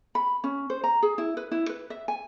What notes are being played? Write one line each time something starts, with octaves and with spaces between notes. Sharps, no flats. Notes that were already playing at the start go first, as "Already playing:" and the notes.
B5
C#4
C5
A#5
G#4
E4
B4
E4
B4
E5
G#5